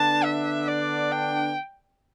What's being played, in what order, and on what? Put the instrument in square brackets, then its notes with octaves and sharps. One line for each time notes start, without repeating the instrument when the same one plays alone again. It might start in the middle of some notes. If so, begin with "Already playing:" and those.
Already playing: [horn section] D3 B3 D4 [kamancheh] A5
[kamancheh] E5
D5
G5